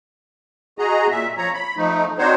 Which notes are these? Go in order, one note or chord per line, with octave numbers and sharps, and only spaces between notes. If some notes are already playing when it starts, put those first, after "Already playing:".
F#4 G#4 D#5 A#5
A#2 E5
F3 C#5 A#5
B5
F3 A3 D#4
C4 D4 D#4 F#4 C5 C#5